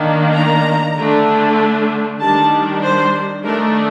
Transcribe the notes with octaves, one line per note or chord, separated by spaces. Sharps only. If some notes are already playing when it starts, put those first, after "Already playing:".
Already playing: D#3 A#3 D4
A#5
D3 A3 D4
D#3 G3 D4 A5
C5
D#3 A3 D4 A#4